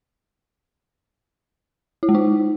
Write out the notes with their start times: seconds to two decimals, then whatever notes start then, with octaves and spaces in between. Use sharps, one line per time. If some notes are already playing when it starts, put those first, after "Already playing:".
2.03 E4
2.09 G#3
2.15 D#4